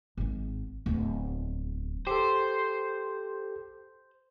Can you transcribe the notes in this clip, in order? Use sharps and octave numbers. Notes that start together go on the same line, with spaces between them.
G#1 G#2
D1 E2
G4 A4 C5